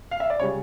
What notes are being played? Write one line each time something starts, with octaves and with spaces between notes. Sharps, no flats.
F5
E5
D5
C#3 G3 C#5